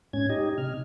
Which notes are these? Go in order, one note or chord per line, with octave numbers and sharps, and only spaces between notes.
G#2 C#4 G#6
D#4 G4 D#5
C3 F6